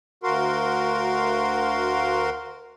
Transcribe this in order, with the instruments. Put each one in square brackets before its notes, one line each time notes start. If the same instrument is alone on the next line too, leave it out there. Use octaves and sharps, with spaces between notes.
[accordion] D2 F#4 A#4 F5 C6